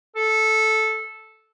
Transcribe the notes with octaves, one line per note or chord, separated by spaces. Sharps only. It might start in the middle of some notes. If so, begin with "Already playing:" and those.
A4